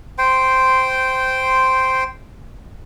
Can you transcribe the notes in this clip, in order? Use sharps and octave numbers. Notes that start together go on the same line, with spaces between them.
C5 G5 C6